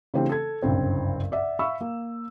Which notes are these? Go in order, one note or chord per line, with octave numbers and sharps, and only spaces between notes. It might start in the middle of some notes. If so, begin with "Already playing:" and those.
C#3 E3 A3 C4 D4 G4
A4 G#6
F#1 C2 G2 C#3 C4
D5 E5 F#5
E5 F5 B5 C#6 E6
A#3